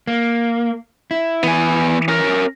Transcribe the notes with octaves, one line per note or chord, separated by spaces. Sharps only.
A#3
E4
E3 B3 G#5
C#4 A#4